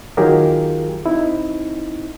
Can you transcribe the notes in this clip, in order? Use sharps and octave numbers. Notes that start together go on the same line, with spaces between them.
D#3 F#3 F4 G4 G#4 A#4
C4 D#4 E4